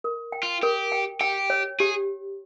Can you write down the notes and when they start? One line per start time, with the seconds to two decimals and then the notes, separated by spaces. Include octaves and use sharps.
0.04 A#4
0.32 G5
0.43 F4
0.62 G4 A#4
0.92 G5
1.21 G4 G5
1.50 C#5
1.80 G4 G#4